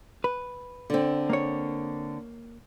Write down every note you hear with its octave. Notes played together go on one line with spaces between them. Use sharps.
B4
D3 C4
A#3 C#5